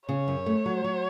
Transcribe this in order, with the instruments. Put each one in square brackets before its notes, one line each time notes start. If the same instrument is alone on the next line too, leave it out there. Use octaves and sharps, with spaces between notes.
[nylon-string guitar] C#3 [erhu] C#5
[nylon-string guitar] F#2
A3
F#3
F#3